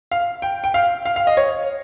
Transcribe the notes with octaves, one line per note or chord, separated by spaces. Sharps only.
F5
G5
G5
F5
F5
F5
D#5
C#5